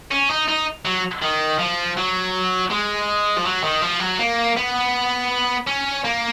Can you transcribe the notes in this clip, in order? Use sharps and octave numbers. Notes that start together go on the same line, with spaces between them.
C#4
D#4
D#4
F#3
D#3
F3
F#3
G#3
F3
F#3
D#3
F3
F#3
A#3
B3
C#4
A#3